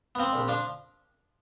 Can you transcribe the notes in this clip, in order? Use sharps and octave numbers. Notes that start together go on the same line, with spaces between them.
B3
F3 C4
A#1
F3 D4